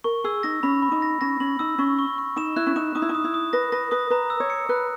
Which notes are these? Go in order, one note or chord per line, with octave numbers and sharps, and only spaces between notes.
A#4 C#6
G#4 E6
D#4 A#6
C#4 B5
B5
D#4
A#6
C#4 A#6
C#4 F#7
D#4 E6
C#4 C#6
C#6
C#6
D#4 E7
E4 F#6
C#4
D#4 E7
D#4 D#6
E4
D#4
D#6
E4
D#6
B4 A#6
B4 A#6
B4 D#6
B4 A#5
E6
C#5
C#7
B4 F#6